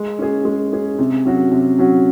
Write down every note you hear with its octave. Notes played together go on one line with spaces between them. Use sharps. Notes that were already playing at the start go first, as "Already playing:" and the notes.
Already playing: G#3
C#4 G#4
G#3
C#4 G#4
C3
F#3 C#4 F#4
C3
F#3 C#4 F#4